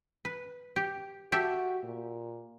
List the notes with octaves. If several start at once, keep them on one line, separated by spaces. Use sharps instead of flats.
B4
G4
F#4 G4 A4 E5
A#2